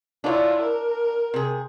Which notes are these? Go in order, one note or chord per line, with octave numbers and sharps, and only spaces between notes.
D4 E4 F4 C#5
A#4
C3 G#4